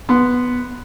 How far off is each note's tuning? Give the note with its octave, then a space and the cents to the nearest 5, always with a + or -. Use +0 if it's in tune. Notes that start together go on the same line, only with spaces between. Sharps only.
B3 +0 C6 -15